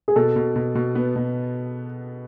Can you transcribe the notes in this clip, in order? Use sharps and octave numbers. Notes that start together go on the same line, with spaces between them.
G#4
B2 A4
B2
B2
B2
B3
B2